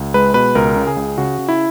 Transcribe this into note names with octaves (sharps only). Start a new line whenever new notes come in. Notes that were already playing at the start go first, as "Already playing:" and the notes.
Already playing: C#2
G#3 B4
B2 B4
C#2 A#4
C#3
G#4
C#2
C#3 F#4
C#3
E4